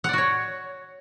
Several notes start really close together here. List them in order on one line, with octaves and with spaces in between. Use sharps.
F#5 D5 F#4 C#5